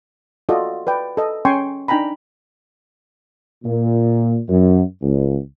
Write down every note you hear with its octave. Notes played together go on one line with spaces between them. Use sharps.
F4 F#4 A4 D5 D#5
B4 D5 G5
A4 D#5
C#4 G5 G#5 C6 C#6
D4 D#4 G5 G#5 A#5 B5
A#2
F#2
C#2